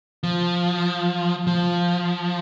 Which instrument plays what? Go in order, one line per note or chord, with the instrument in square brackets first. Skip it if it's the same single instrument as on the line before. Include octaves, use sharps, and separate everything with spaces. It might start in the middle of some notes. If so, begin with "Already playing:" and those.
[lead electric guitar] F3
F3